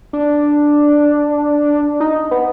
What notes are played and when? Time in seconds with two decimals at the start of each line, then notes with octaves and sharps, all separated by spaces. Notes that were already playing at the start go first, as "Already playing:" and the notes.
0.13 D4
2.00 D#4
2.31 B3